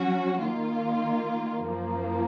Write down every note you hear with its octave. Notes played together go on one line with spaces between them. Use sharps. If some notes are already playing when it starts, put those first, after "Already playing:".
Already playing: F#3 C#4 F#4
D#3 A#3 F4
F#2 F3 A#3